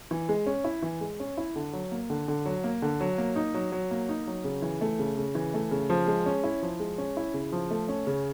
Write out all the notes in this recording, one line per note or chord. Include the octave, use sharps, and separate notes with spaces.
E3
G#3
C#4
E4
E3
G#3
C#4
E4
D3
F#3
A#3
D3
D3
F#3
A#3
D3
F#3
A#3
D#4
F#3
F#3
A#3
D#4
F#3
C#3
E3
A3
C#3
C#3
E3
A3
C#3
F3
G#3
C#4
E4
F3
G#3
C#4
E4
C#3
F3
A3
C#4
C#3